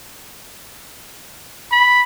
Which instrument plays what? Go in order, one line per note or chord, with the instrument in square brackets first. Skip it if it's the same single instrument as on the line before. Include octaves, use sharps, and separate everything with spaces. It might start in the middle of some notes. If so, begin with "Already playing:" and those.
[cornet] B5